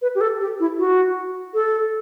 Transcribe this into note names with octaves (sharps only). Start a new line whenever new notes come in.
B4
G4
A4
G4
E4
F#4
A4